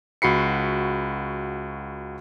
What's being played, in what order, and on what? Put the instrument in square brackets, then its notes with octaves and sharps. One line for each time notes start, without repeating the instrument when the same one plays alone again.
[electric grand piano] C#2 F#4 B5 C7 C#7